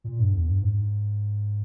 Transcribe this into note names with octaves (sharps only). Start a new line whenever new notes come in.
A#2
G2
E2
G2
G#2